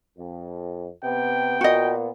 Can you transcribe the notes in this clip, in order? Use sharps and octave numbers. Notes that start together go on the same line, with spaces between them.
F2
C3 B3 G5
A#2 B3 F#4 D#5